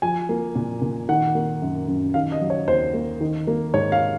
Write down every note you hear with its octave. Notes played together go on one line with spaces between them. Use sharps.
F3 G#5
A#3
A#2
A#2
D#3 F#5
A#3
F#2
F#2
D#3 F5
D#5
F#3
C#5
D#2 C5
A#3
D#3
A#3
G#2 C#5
F5